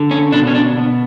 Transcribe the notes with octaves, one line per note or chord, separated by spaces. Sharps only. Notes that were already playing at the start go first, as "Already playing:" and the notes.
Already playing: D3
C#4
B2 D4
C#4
D4
B2